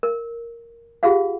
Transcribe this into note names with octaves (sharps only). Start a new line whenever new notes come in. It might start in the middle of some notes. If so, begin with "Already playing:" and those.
A#4
F4 G4 G#4 F5 F#5